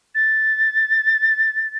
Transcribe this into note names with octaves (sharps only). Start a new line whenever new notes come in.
A6